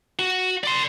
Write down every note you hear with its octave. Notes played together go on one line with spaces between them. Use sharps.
F#4
D5 C6